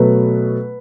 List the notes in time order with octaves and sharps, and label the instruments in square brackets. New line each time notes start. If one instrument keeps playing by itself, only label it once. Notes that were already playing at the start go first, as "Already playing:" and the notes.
Already playing: [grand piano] B2 F#3 A3 B4